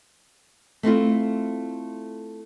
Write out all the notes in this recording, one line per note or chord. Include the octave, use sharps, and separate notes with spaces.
A3 C4 E4 F4